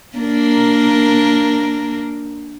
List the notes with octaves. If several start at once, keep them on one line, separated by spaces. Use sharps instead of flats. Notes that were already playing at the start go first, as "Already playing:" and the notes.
A#3 D4 A#4